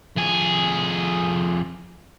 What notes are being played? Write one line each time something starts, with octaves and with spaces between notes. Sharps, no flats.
F2 G#4